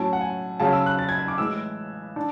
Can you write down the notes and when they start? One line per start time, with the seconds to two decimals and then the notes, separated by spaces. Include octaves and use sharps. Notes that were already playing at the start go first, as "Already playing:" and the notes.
Already playing: A2 F#3 C#4 A5
0.13 F#5
0.21 G#5
0.60 C#3 F#3 C#4 A5
0.73 E6
0.86 F#6
0.99 A6
1.09 G#6
1.19 G#6
1.28 D6
1.38 A2 E3 G#3 E6
2.16 D4